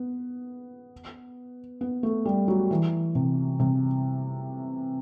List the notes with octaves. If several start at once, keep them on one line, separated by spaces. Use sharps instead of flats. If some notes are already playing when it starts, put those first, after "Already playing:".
Already playing: B3
B3
A3
G3
F#3
E3
C3
C3